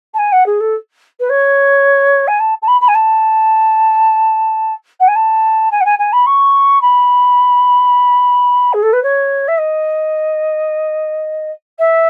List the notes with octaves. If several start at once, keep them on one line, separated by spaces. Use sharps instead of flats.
A5
G#5
F#5
G#4
A4
B4
C#5
G#5
A5
A5
B5
B5
G#5
A5
F#5
G#5
A5
G#5
F#5
G#5
G#5
B5
C#6
B5
G#4
A4
B4
C#5
E5
D#5
E5